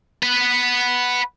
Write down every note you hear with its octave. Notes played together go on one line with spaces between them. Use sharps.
B4 F#5